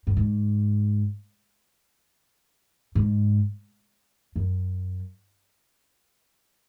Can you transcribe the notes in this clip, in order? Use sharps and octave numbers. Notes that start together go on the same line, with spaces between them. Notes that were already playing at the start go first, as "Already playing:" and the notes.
G2
G#2
G#2
F#2